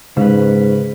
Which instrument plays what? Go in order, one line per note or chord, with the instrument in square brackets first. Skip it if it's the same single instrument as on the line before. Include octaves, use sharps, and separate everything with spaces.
[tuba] G#2 [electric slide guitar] C#3 C#4 B4 [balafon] G#3